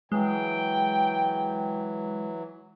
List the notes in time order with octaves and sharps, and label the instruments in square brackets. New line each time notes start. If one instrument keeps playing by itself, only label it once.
[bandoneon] E3 F#3 [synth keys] G#3 [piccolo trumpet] G5